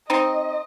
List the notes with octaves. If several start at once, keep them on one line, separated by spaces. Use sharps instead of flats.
C4 D#4 D#5